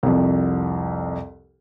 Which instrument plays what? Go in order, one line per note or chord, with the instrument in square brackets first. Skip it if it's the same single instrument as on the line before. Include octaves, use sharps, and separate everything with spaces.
[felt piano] C2 F2